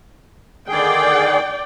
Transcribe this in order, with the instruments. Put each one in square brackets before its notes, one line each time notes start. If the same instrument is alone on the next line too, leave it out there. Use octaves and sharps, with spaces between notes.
[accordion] D3 D#3 G#4 [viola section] D5 G5